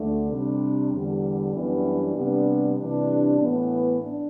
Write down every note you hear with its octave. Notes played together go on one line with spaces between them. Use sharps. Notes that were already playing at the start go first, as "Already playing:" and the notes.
Already playing: D2 D3 A3 D4
C3 G3 D4
E2 D3 G3
F#2 E3 G3 B3 D4
C3 G3 B3 D4
C3 E3 G3 D4
A2 E3 B3
D4